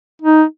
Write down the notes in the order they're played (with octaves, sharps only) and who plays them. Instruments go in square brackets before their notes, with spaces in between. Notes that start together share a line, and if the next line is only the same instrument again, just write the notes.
[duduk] D#4